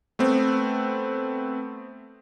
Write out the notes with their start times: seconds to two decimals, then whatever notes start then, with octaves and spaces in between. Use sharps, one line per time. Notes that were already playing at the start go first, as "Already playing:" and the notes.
0.19 A3 B3 C4